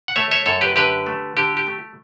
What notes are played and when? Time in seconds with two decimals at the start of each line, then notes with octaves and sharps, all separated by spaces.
0.08 F#5
0.16 A3 C#5 E5
0.31 C#5 E5
0.46 F#2 A4 C#5
0.61 G4 B4
0.76 D3 G4 B4
1.06 A3
1.37 D3 G4
1.57 G4
1.67 A3